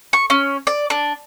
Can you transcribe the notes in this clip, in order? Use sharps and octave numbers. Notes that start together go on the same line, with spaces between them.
C#6
C#4
D5
D4